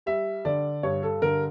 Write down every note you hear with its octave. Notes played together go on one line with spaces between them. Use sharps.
G3 E5
D3 D5
G2 C#5
A4
D3 A#4